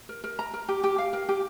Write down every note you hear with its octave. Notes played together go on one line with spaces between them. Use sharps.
A#4
A#4
A#5
A#4
G4
G4
F5
A#4
G4